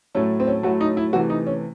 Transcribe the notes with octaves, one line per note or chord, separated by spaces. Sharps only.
A2 F#3 A3 C#4
C4
C#4
A2 F#3 A3 F#4
D#4
E4
C3 E3 A3 F#4
D#4
C#4